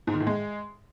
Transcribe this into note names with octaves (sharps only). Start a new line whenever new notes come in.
G#2
D#3
A2
G#3